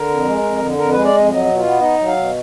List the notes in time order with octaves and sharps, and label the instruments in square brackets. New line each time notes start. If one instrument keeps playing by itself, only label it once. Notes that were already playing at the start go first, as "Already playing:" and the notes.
Already playing: [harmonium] D3 A#4
F2
G#3
F2
D3
F2 A#4
G#3 B4
D5
F2 D#5
F#3 D#5
B2
F4
B3
D#4 D#5
F#3
F5
B2